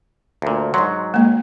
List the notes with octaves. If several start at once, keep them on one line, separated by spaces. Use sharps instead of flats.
D2 A#2
G#2 F#3 C6
G#3 A#3